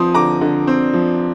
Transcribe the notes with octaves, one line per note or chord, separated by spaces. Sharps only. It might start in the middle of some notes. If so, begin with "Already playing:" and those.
Already playing: F3 C4 C6 D#6
D3 A#5 D6
D3
C4
F3